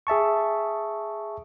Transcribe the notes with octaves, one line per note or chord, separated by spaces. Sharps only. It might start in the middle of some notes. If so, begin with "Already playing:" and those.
G#4 E5 A5 C#6